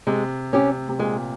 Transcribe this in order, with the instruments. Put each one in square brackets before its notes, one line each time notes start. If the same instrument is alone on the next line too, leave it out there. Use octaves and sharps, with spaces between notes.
[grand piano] C3 [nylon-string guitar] G#3
[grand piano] C3 [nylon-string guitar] C#4 G4
[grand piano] C3
[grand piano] A#2 [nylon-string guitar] G#3